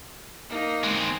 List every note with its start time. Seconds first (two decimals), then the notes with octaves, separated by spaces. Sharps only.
0.49 A#3 D#4
0.84 G#3 C4